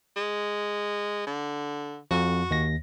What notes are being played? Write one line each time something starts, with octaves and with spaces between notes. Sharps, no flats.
G#3
D3
F2 F#4
D#2 A#6